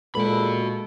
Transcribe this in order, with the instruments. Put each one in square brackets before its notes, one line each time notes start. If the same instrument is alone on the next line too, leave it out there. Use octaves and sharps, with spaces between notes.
[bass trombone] A#2 [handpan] G#3 A4 B4 [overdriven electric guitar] F#4 B5